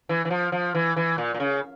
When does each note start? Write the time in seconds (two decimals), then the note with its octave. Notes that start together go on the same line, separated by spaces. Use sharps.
0.09 E3
0.25 E3
0.30 F3
0.52 F3
0.75 E3
0.96 E3
1.18 A#2
1.34 A#2
1.40 C#3